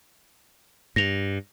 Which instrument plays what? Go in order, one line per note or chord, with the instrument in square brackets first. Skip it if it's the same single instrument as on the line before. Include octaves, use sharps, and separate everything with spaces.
[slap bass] G2 [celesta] A#6 F7